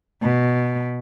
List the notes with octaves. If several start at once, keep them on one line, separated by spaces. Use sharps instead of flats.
B2